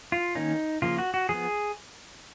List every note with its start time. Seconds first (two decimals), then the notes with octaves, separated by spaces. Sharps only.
0.12 F4
0.35 D#3 A#3 C#4 D#4
0.82 C#3 F3 A#3 F4
0.98 F#4
1.14 F#4
1.29 F3 B3 G#4